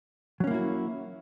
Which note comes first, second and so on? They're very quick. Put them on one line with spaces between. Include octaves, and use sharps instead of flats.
F#3 C#4 A#3 E4 F#4